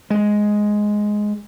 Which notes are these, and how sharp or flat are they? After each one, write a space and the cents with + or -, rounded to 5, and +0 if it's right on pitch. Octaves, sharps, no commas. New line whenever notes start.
G#3 +5